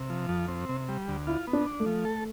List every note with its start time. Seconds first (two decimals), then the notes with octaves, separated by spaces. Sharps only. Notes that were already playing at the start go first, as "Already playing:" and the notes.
Already playing: C3
0.10 F3
0.29 F2
0.48 C4
0.69 C3
0.88 G3
1.08 D2
1.27 E4 F4
1.47 B3
1.53 D4
1.66 D4
1.80 A3
1.86 F3
2.05 A4